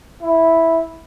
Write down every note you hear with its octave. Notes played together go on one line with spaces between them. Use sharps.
E4